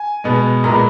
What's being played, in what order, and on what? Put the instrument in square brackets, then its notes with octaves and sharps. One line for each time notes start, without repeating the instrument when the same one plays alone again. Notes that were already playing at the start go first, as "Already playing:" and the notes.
Already playing: [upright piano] G#5
B2 G#3 B3
A#2 G#3 B3 A#5